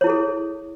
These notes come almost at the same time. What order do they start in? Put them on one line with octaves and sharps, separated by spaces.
C#5 E4 G#4 A4